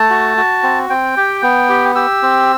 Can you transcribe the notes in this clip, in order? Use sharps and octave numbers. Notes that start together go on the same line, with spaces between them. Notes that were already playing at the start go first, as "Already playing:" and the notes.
Already playing: A3 A5
F#4
F#4
C4
C4 G5
G4
B3
G4
G4 E6
C4